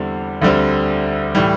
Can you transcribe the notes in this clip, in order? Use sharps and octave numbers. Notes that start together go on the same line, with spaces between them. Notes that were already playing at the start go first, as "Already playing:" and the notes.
Already playing: E2 D3 G3 C4 E4
D2 D3 G3 C4
A2 E3 G3